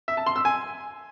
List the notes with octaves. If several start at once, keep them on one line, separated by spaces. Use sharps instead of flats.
E5
A5
C6
E6
G#5